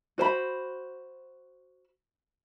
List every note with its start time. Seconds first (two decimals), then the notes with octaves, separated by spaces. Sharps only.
0.18 F#4 C5 G#5 B5